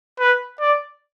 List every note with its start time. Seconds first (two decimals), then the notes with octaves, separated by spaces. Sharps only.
0.20 B4
0.60 D5